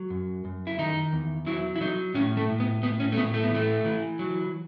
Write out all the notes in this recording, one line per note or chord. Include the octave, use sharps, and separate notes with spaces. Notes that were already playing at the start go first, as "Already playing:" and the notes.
Already playing: F#3
F#2
F#2
E4
D#3 D#4
E2
F#3 E4
E4
F#3 D#4
A2 C#4
A3
A2
B3
A2 B3
C#4
A3
A2 B3
A3
B3
E3 A3
E3
F#3